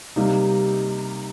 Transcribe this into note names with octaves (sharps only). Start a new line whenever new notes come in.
C3 G3 A#3 D#4